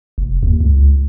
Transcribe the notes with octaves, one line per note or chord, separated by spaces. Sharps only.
F1
D#2
C#2